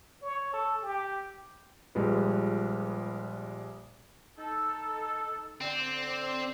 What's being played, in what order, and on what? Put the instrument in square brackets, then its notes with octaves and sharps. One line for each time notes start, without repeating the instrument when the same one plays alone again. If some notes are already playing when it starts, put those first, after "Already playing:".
[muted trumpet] C#5
A4
G4
[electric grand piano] A#1 G3 G#3 F4 B4
[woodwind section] D#4 A4
[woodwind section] D3 D5 [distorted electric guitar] C4